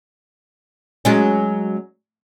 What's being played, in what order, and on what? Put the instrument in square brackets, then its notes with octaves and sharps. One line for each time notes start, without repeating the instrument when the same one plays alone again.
[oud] F#3 G#3 C#4